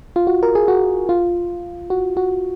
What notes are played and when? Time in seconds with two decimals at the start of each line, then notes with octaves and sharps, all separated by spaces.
0.16 F4
0.27 F#4
0.43 A#4
0.55 G#4
0.68 F#4
1.09 F4
1.90 F#4
2.17 F#4